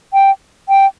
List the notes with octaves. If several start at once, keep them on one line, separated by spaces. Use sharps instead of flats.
G5
G5